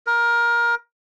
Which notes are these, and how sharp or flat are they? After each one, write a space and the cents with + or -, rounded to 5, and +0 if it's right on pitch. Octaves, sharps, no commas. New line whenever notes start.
A#4 +20